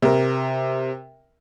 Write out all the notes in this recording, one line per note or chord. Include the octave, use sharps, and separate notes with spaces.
C3 A#4